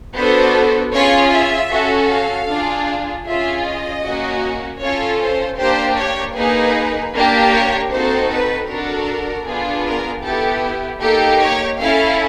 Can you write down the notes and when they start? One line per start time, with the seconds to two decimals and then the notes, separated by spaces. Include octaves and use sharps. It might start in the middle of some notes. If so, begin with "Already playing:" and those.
0.16 B3 D4 F#4 A4 C5
0.93 C#4 F4 G#4 C#5
1.32 E5
1.71 C#4 F#4 A4
2.09 F5
2.48 D4 F4 G#4
3.25 C#4 F4 G#4 E5
3.64 D#5
4.03 A#3 C#4 F#4
4.81 C#4 F4 A4 C#5
5.20 C5
5.59 A#3 D4 G4 C5
5.97 C#5
6.36 A#3 D#4 G#4 B4
7.14 A#3 D4 G4
7.53 C#5
7.92 C4 D#4 F#4 A4 C5
8.30 B4
8.68 D4 F#4 A4 A#4
9.46 B3 D4 F4 G#4
9.86 A#4
10.24 B3 E4 G4 A4
11.02 A#3 D#4 G4 A4
11.41 C#5
11.80 C#4 E4 A4 F5